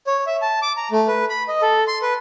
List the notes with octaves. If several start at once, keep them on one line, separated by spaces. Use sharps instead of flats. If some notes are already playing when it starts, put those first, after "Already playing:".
C#5
E5
A5
D6
A#5
A3
B4
B5
D#5
A4
C6
B4